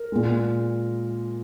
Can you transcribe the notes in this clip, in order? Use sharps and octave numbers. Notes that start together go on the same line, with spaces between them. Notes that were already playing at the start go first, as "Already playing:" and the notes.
Already playing: A#4
A#2 G#3